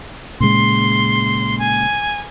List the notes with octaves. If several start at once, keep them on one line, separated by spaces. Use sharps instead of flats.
A#2 C#3 G#3 C6
G#5